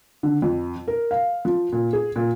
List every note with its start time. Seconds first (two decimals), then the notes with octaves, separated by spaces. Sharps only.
0.23 D3
0.42 F2
0.88 A#4
1.11 F5
1.45 F3
1.72 A#2
1.93 G#4
2.16 A#2